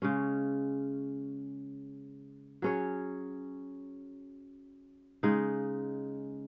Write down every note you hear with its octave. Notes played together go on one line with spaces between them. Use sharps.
C#3 G#3 C#4
F#3 C#4 G#4 C#5
C#3 G#3 D#4